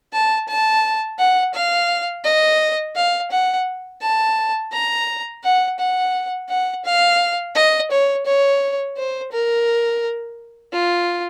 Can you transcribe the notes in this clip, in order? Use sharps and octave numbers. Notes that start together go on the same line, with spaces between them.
A5
A5
F#5
F5
D#5
F5
F#5
A5
A#5
F#5
F#5
F#5
F5
D#5
C#5
C#5
C5
A#4
F4